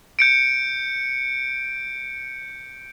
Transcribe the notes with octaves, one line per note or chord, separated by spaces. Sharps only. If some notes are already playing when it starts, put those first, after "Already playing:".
G6 C#7 D7